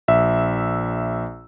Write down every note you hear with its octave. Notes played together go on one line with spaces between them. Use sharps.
A#1 E5 E6